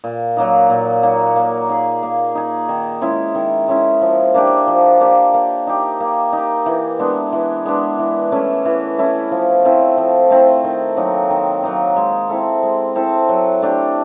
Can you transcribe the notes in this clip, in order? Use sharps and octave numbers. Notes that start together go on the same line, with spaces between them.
A#2
F#3 A#3 D#4
A#2
F#3 A#3 D#4
A#3
D#4 G#4
A#3
D#4 G#4
D#3
G#3 C#4 E4
D#3
G#3 C#4 E4
F3
A#3 D4 G4
F3
A#3 D4 G4
A#3
D#4 G4
A#3
D#4 G4
E3
G#3 B3 D4
E3
G#3 B3 D4
E3
A3 C#4 E4
E3
A3 C#4 E4
F3
A3 C4 E4
F3
A3 C4 E4
D#3
F#3 A#3 D#4
D#3
F#3 A#3 D#4
G#3
C4 E4 A4
G#3
C4 E4 A4
F#3
A3 D4 G4